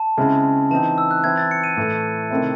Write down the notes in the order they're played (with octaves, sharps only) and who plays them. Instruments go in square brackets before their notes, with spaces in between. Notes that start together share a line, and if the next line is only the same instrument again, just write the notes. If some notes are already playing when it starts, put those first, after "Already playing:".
Already playing: [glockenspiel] A5
[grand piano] C#3 G#3 C4 E4
[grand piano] E3 C4 D#4 [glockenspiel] A5
[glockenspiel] E6
F#6
[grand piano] E3 C4 E4 [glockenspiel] G#6
[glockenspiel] A6
C#7
D#7
[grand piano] A2 E3 A3
C3 D#3 A3 C4 E4